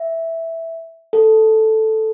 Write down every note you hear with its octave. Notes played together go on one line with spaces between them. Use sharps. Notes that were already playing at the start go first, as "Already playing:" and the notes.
Already playing: E5
A4